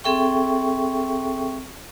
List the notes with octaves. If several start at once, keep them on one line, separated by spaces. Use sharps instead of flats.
C4 G#4 A4 E5 G5 C#6